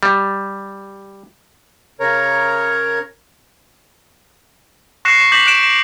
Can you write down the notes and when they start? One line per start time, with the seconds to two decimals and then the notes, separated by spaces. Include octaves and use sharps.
0.03 G3
2.00 C#3 A#4 C#5 A#5
5.05 C#6 F#6 A#6 C7 C#7 E7
5.20 C#6 E7
5.32 D6 G6 A#6 B6 E7 F#7
5.46 C#6 F#6 D7 E7
5.63 E7